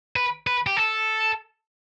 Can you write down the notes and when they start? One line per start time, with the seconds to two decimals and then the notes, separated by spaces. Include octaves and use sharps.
0.16 B4
0.47 B4
0.67 G4
0.77 A4